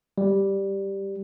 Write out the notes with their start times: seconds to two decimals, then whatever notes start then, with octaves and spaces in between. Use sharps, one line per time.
0.18 G3